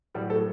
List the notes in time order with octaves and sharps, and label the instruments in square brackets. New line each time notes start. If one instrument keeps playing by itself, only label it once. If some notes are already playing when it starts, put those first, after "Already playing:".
[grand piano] A2 F#3 G3 G4
A3 A4